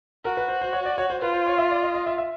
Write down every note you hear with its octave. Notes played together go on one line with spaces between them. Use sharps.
F#4 A#4
B4
C5
C5
C#5
D5
C#5
C5
F4 B4
C5
C#5
E5
D5
D#5
D#5
E5
E5